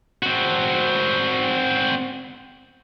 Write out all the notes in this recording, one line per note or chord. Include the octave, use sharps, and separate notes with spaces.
C4 F#4